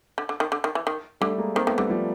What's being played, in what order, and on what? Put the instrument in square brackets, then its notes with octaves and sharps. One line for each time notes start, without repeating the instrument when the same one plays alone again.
[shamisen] D3
D3
D#3
D3
D#3
E3
D#3
[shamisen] D3 [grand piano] G3 A3
[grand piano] G#3 A#3
[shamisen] D#3 [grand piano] A#3 C4
[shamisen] D#3 [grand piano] A3 B3
[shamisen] D3 [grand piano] G3 A3
[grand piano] F3 G3